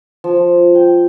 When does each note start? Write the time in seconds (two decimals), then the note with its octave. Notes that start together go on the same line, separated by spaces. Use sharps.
0.24 F3
0.75 G5